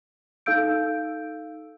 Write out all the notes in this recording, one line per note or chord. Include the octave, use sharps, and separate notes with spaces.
D#4 A4 F5 E6 G6 D7